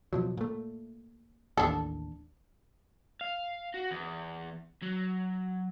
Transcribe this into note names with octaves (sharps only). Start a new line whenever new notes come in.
B2 F3 F#3
A#2 A3
A1 D#2 D4 A4
F5
F#4
E2
F#3